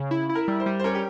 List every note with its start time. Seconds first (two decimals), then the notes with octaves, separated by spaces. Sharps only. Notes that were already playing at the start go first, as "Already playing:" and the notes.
Already playing: C#3
0.11 E4
0.29 E4
0.35 A#4
0.48 G3
0.60 C5
0.66 G3
0.80 C5
0.84 C#4 A#4
0.95 G4